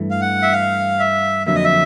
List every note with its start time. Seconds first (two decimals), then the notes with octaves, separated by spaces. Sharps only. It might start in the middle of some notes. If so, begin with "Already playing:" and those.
Already playing: G2 E3 A3
0.11 F5
0.21 F#5
0.42 E5
0.52 F5
0.99 E5
1.47 F2 D3 F#3 A#3 E5
1.55 D#5
1.64 E5